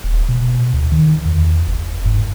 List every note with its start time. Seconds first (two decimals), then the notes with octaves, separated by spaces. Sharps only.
0.04 D#1
0.29 B2
0.74 D2
0.92 D#3
1.25 E2
1.68 F#1
2.06 G#2